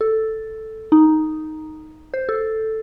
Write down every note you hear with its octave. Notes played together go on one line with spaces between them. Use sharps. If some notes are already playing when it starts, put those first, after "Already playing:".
A4
D#4
C5
A4